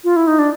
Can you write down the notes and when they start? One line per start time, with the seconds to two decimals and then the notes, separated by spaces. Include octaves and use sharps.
0.04 F4
0.16 E4
0.27 D#4
0.39 D4